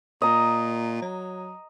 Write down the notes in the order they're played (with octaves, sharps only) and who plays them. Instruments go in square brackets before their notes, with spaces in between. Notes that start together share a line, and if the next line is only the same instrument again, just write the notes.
[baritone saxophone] A#2 [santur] D#5 A#5
[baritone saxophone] F#3